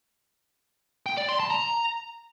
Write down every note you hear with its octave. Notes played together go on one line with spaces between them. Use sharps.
G5
D5
C6
A5
A#5